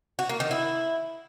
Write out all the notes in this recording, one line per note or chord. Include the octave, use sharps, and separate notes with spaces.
F#4
A#3
D#3
E4